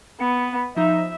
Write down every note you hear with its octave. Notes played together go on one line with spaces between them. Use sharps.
B3 C#7
F3 D#4 E5